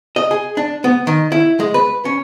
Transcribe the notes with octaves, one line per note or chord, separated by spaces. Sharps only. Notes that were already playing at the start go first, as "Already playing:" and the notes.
D#5
G#4
D4
B3
D#3
E4
G#3
B4
C#4